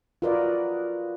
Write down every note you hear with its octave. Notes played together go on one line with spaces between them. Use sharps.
F4 F#4 A#4 B4 D5 D#5